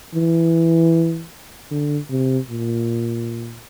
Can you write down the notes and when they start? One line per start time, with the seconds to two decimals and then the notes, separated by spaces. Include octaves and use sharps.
0.14 E3
1.71 D3
2.11 C3
2.50 A#2